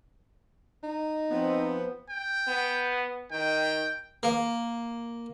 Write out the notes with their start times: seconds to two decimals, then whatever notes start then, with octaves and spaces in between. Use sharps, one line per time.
0.83 D#4
1.31 F3 B3 C4
2.09 G5
2.48 B3
3.32 D#3 G5
4.23 A#3